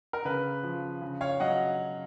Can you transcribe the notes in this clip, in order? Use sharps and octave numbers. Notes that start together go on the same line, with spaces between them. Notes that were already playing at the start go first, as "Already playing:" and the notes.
A#4
C#3 B4
F3
C#3
C#5 F5
F#3 D#5 F#5